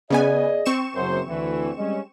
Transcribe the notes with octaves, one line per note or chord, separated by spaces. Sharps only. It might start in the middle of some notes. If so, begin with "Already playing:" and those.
C#3 B3 G#4 D5 D#5 G#5
C4 C#6 E7
F#1 F#2 C5
D2 E3
G3 G#3 C#4